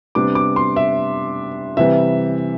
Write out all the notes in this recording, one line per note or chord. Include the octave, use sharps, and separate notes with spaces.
C3 G3 B3 D4 D6
D6
C6
E5
C3 E3 G3 E5